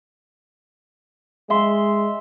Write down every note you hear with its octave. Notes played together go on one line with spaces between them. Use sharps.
G#3 E5 C6